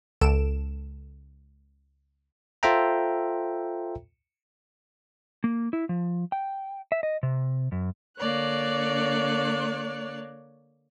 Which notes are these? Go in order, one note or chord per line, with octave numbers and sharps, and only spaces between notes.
C#2 A4 D7 E7
F4 A4 C5 E5 G5 A#5
A#3
E4
F3
G5
E5
D#5
C3
F#2
D3 A#3 C#5 D5 F#6